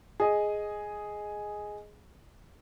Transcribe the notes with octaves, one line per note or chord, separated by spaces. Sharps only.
G#4 D#5